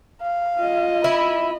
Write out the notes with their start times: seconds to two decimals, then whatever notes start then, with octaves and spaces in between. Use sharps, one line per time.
0.22 F5
0.58 F4 D#5
1.04 E4 B5